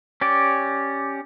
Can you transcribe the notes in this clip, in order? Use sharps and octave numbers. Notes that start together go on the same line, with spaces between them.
C#4 G4 D5